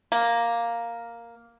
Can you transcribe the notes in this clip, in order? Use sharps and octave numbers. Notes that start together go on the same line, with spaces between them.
A#3